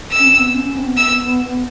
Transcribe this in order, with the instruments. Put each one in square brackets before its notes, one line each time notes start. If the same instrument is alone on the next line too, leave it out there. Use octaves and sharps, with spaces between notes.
[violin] E6
[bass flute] C#4
C4
B3
C#4
C#4
C4
B3
[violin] E6